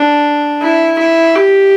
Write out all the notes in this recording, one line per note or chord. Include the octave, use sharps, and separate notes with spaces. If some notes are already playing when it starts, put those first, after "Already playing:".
Already playing: D4
E4
E4
G4